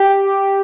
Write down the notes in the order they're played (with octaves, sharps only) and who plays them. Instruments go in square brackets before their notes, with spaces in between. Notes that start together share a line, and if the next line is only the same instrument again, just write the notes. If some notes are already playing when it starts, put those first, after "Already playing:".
Already playing: [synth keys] G4